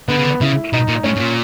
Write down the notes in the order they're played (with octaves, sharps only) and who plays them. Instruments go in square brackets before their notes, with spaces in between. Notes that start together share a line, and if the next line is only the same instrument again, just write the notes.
[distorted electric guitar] D3 [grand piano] B3
[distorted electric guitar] C#3
D3
[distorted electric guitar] C#3 [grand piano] E4
[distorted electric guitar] B2 [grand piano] D#4
[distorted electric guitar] A#2
[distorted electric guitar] A2 [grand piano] C#4
[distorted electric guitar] A2
A#2